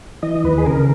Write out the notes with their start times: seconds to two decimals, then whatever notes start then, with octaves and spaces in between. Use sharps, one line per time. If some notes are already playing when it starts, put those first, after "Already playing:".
0.23 E3 D#5
0.44 D#2 B4
0.58 G#4
0.66 C#3 A#4